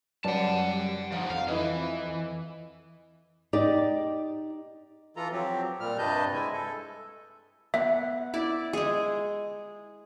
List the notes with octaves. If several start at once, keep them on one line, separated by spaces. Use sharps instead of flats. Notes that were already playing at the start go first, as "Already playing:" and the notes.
F#2 G3 B4 D5 F#5 A5
F3 D#4 F#5
F2 F5
E3 E4 B4 D#5
D#4 G4 D5
E3 F4 A4 A#5
F3 F#3 C4 G4
A#2 G3 F6
G2 C3 B4 D#5 A5 G6
G#3 E4 G#5
A4
B3 E5
E4 D5
G#3 G#4